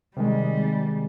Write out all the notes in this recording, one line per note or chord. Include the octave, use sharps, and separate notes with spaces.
C3 D#3 G3 G#3